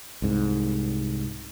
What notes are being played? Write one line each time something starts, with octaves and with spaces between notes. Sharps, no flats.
C2 G#2